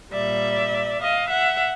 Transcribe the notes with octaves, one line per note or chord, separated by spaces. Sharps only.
A#2 G3 D5 E5
D#5 F5
E5 F#5